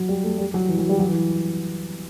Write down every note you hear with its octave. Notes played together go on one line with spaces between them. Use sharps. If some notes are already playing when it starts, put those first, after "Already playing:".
Already playing: F#3
G3
A3
G3
F#3
E3
F#3
G3
F#3
E3